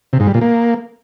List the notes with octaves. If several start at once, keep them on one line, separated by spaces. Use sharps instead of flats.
C3
G#2
G3
A#2
A#3